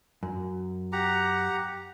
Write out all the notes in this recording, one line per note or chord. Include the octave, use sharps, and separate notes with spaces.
F#2
G4 F#5 A#5